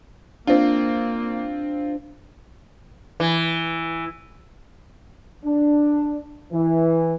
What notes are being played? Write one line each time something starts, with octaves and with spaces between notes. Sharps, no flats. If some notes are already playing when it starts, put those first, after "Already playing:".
A#3 C4 D4 F4
E3
D4
E3